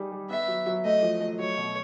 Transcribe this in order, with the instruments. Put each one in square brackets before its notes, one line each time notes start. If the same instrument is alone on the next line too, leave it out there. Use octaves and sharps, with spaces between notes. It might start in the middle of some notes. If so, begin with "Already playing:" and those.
Already playing: [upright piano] G3 D#4 G#4
G3
[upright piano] B3 [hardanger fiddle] E5
[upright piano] F#3
F#3
[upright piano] A3 [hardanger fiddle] D#5
[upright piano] F3
A3
[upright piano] F#3 [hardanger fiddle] C#5
[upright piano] B2